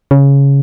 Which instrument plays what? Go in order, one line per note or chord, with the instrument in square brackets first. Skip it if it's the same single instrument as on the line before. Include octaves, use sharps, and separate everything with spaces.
[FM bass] C#3